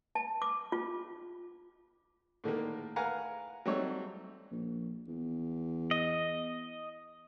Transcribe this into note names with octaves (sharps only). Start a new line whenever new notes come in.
A5
D6
F4
A2 D3 D#3 A#3
A#4 B4 F5 F#5 G#5 A#5
F#3 G3 A3 C4 D#4 C#5
A#1
E2
D#5